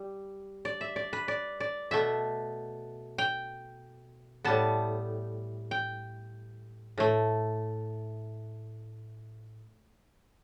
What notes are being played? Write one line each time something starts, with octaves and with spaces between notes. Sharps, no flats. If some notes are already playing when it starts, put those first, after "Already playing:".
Already playing: G3
D5
E5
D5
B4
D5
D5
B2 A3 E5
G5
A2 G3 B3 A5
G5
A2 A3